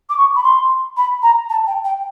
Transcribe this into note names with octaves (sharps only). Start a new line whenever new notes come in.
D6
C#6
B5
C6
B5
A#5
A5
G5
G5